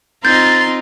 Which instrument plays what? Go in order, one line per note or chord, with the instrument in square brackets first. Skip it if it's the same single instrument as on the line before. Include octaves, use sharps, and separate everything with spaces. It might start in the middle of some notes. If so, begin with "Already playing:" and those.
[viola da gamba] C4 D#4 F4 [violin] A#5 C6 [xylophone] G6 [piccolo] A6